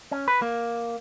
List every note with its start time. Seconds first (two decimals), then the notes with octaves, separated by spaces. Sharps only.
0.11 C#4
0.28 B4
0.42 A#3